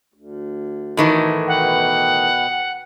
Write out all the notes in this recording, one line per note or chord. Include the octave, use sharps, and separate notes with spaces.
D2
A2 D#3 E3
B2 B4 F#5 G5